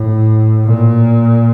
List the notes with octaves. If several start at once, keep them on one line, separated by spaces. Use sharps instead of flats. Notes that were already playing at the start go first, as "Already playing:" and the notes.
Already playing: A2
A#2